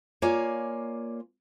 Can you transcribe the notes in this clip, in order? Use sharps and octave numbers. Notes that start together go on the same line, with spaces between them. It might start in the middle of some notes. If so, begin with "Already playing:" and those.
A#3 F4 C#5 D5 G#5